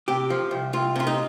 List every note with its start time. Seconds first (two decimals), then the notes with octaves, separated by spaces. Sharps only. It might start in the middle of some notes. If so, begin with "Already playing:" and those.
0.08 C3 G4
0.30 F3
0.51 C2
0.73 C2 F4
0.95 C3 F4
1.07 D#4